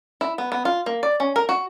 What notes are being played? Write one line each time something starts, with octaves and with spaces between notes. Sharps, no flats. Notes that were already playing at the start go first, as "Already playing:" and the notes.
E4
B3
B3
F4
A#3
D5
C#4
A#4
F#4